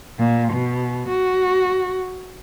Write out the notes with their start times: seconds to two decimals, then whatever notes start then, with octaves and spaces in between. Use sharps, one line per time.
0.19 A#2
0.52 B2
1.08 F#4